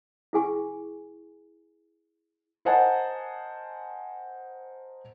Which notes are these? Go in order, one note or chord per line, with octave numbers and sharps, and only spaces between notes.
E4 G#4 G#5 C#6
A#4 C5 D#5 F#5 G#5 A5